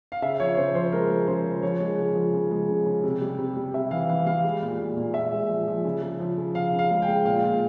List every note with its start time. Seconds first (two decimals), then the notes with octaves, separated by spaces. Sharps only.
0.12 F5
0.22 C#3 E5
0.40 F3 C#5
0.57 C#3 C5
0.75 F3 C5
0.92 G#3 A#4
1.10 G#3
1.27 C#3 C5
1.45 F3
1.63 F3 C#5
1.80 G#3
1.98 C#3
2.15 F3
2.33 C#3
2.51 G#3
2.69 C#3
2.86 C#3
3.04 C3
3.21 G3
3.38 C3
3.56 G3
3.74 C3 E5
3.91 E3 F5
4.09 E3 F5
4.26 G3 F5
4.44 G#3
4.62 A#2
4.79 A#2
4.97 A#2
5.14 A#2 E5
5.32 G#3
5.49 F3
5.67 F3
5.85 C#3
6.02 C#3
6.20 F3
6.38 C#3
6.55 C#3 F5
6.72 C#3
6.79 F5
6.90 G#3
7.02 G5
7.08 G#3
7.25 A#2 F5
7.44 A#2